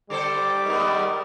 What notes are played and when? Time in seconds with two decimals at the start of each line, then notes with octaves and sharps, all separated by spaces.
0.10 D3 G3 A4 C5 D6
0.66 D#3 G#3 B3